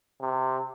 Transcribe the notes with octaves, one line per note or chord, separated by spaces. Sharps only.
C3